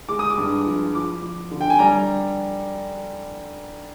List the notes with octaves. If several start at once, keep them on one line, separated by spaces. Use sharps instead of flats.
G#3 D6
D#6
D6
G2
F3
F3 D6
F3
D3
G5
G#5
G3 A#5